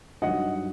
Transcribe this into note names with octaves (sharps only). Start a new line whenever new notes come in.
G2 D#3 F#3 D#5 F#5